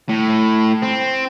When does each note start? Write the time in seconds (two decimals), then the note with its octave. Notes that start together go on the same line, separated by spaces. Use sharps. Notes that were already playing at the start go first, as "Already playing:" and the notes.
0.09 A2
0.83 C4